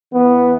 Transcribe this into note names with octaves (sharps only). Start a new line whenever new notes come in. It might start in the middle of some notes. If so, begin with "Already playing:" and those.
E2 E3 B3